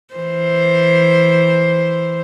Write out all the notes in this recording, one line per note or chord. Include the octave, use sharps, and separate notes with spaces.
E3 C5